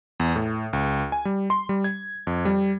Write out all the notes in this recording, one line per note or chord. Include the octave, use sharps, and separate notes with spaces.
E2
A2
C#2
G#5
G3
C6
G3
G#6
F2
G3